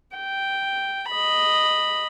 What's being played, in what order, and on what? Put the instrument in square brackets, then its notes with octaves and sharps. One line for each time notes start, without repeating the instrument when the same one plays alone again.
[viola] G5
D#5 B5